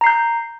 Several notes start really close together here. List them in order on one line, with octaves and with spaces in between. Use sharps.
A#5 C7 G6